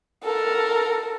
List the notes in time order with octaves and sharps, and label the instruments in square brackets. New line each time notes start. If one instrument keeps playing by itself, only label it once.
[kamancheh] A4 A#4